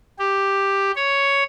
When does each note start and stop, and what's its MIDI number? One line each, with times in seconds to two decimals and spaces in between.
0.19 0.91 67
0.95 1.43 73